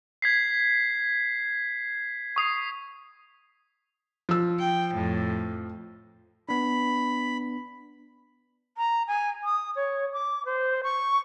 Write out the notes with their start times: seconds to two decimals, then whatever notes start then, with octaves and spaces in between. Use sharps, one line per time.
0.22 G#6 B6 C7
2.36 C#6 D#6 C7
4.29 F3 E6
4.59 G5
4.93 F2 A2
6.49 B3 D4 B5
8.77 A#5
9.07 G#5
9.44 D#6
9.76 C#5
10.13 D6
10.45 C5
10.83 C#6